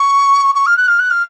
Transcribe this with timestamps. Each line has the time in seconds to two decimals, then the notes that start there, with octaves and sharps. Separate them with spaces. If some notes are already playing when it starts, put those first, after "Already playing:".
Already playing: C#6
0.54 C#6
0.66 F6
0.77 F#6
0.87 F6
0.99 F#6
1.10 F6